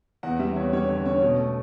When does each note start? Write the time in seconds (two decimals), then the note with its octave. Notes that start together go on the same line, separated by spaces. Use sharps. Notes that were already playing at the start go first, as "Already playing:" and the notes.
0.23 E2 F#5
0.39 G3 E5
0.56 E2 C#5
0.73 G3 C#5
0.89 D3 C#5
1.06 C#4 C#5
1.22 B2
1.38 A3